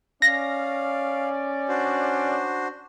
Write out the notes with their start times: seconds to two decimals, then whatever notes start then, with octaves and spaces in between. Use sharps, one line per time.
0.22 C#4 D5 F5 A#6
1.68 D4 F#4 C5